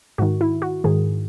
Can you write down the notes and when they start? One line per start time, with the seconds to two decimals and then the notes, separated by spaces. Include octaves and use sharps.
0.18 G#2 D#3 F#4
0.41 E4
0.62 F#4
0.84 G#2 D#3 G#4